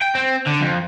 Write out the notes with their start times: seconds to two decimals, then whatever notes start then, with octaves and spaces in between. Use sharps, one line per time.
0.02 G5
0.15 C4
0.46 D3
0.61 F2